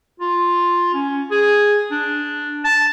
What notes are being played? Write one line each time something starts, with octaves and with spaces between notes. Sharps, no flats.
F4
C#4
G#4
D4
A5